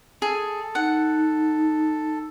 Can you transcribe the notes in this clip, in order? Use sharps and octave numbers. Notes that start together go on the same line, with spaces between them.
G#4 A4
D#4 F#5